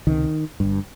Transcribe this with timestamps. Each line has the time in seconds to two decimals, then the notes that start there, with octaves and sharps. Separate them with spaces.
0.07 C#2 C3 D#3
0.60 G1 G2